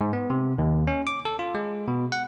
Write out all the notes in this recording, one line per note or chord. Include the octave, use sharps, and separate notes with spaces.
G#2
B3
C3
D#2
C#4
D6
A4
F4
G#3
B2
F#5